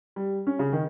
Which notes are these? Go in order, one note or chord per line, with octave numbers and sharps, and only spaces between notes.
G3
C#4
C#3
D#3